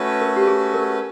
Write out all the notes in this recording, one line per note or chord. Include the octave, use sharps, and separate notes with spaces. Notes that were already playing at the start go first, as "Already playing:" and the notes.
Already playing: A3 C#4 F#4 B4
A#4
G4
G#4
A#4